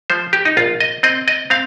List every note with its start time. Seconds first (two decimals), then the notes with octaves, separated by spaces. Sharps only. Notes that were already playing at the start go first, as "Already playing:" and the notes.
0.10 F3 C5
0.33 G4
0.45 D#4
0.57 A#1 F4
0.80 D#5
1.03 C4 D#5
1.28 D#5
1.50 C4 F5